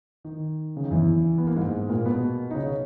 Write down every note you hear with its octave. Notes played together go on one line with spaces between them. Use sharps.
D#3
C#3
D#3
E2 E3
B3
A#3
G#2 G#3
A#2 A#3
B2 B3
D#4
C#3 C#4